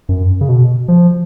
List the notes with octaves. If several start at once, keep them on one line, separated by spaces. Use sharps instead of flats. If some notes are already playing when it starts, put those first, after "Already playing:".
F#2
C#3
B2
F3